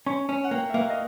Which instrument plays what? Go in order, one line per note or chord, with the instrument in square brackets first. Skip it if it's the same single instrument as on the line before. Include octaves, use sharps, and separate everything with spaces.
[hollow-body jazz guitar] C#4 [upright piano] C#6
[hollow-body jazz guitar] C#4
[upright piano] F#5
[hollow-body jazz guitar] A#3 [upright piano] G5
[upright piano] E5
[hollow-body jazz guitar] A#3 [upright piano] F5
[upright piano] D#5